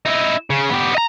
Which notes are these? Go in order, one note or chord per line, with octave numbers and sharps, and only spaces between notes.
D#4 E4
C#3
B3 G4
D#5 A#5